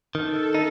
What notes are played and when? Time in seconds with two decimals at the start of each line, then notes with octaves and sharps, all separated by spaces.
0.15 D#3 A4
0.55 D#4